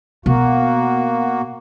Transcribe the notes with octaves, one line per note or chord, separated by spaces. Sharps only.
B2 A#3 F#4